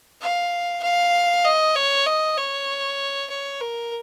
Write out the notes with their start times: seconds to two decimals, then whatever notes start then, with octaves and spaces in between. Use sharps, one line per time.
0.22 F5
0.83 F5
1.45 D#5
1.76 C#5
2.06 D#5
2.37 C#5
3.30 C#5
3.61 A#4